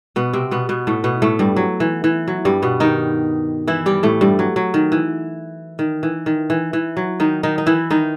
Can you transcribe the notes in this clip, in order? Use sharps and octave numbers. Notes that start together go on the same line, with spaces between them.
B2 B3
C3 C4
B2 B3
B2 B3
A2 A3
B2 B3
A2 A3
G2 G3
F#3
E3
E3
F#3
G2 G3
B2 B3
D#3 D#4
E3 E4
G3 G4
A2 A3
G2 G3
F#3
F#3
D#3
E3
D#3
E3
D#3
E3
E3
F#3
D#3 D#4
D#3 D#4
D#4
E3 E4
D#3 D#4